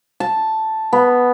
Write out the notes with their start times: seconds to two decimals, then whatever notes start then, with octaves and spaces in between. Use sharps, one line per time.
0.20 A5
0.93 B3